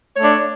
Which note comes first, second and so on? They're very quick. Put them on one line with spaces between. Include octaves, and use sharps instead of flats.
C#5 A3 D4